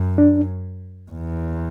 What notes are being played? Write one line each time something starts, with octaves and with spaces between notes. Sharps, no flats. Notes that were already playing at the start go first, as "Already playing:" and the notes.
Already playing: F#2
D4
E2